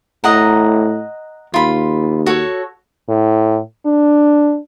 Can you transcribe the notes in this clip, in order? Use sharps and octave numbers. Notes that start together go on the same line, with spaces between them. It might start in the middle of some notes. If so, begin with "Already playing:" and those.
A2 D#5 F#5 A#5
D#2 F4 B5
F#4 A4 C#5
A2
D4